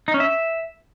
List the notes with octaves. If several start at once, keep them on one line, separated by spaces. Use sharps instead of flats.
D#4
C#4
E5